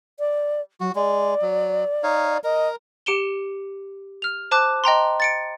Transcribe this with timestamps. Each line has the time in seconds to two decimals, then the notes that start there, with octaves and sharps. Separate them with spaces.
0.19 D5
0.80 F#3 F#4
0.95 G#3 D5
1.42 F#3
2.03 D#4 C#5 F5
2.44 A#4 D#5
3.06 G4 C#7 D7 E7 G7
4.22 F6 F7
4.51 C5 A5 D6 F#6
4.84 D#5 G5 A#5 C6
5.20 A6 C#7 D7